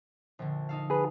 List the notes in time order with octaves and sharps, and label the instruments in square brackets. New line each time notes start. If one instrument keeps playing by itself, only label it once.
[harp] A#1 D3
D#4 A4 F5
[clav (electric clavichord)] G#4 B4